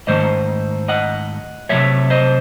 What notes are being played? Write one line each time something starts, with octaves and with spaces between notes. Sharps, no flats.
G#2 D#3 A3 C5 D#5
D#5 F#5
C3 D#3 F#3 A3 C#5 E5
C5 D#5